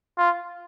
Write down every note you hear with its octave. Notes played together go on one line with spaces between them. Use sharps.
F4